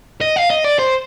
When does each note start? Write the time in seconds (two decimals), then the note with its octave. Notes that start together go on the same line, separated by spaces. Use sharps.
0.21 D#5
0.36 F5
0.50 D#5
0.64 D5
0.79 C5